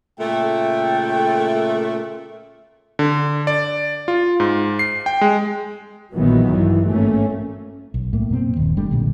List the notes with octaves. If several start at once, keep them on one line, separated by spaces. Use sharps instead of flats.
A#2 C#3 A3 G5
D3
D5
F4
G#2
C7
G5
G#3
A#1 A#2 D#3 E3 F#3 B3
G2 E3
G#1 A3 A#3 C#4
B1
A2 A#3
F#2 B2 A#3 C4
D#1 D#3
F#1 G3 A3 D4
B1 A#2 D3